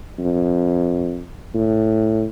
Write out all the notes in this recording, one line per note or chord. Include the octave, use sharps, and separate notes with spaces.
F2
A2